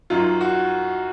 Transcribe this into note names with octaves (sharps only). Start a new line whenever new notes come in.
F#2 D#3 F#3 F4
F#4